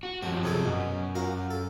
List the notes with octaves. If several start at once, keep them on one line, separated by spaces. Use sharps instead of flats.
F#4
F#2 F3 F#3 G4
C3 G#4 A4
F#2 B2
F#4 A#4 F5
A4